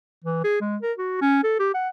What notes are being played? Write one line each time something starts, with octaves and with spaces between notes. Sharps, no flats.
E3
G#4
G#3
A#4
F#4
C#4
A4
G4
F#5